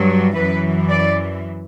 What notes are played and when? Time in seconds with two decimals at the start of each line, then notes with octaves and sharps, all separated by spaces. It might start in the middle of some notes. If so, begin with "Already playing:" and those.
Already playing: G2 F#3
0.34 F#2 E3 B4
0.89 D5